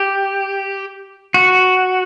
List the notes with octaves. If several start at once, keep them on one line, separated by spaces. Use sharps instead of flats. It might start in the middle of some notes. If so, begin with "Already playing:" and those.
Already playing: G4
F#4